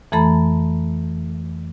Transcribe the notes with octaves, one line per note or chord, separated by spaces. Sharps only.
F2 E3 A3 A4 A#5 B5